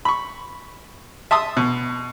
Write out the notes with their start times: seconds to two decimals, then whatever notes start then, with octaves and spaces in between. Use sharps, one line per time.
0.05 B5 C#6
1.31 E5 A5 C6 D#6
1.57 B2